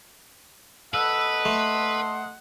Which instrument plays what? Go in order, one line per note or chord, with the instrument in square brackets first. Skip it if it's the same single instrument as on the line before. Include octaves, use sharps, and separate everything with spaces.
[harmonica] A4 D#5 F#5 [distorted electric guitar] B4 [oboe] E6
[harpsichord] A3 [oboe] C6